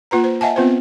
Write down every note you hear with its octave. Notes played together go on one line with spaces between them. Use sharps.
A#3 F4 B4 A#5
C5
D#5 E5 F#5 G#5 A5
B3 C4 F4 B4 C5